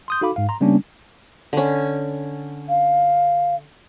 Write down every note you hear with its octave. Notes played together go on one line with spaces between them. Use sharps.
C6 D#6 G6
D#4 F#4 A4 F5 B5 D6
G#2 F5
A#5 C6
C#3 G3 A#3 B3 C#4 D4
D3 C#4
F5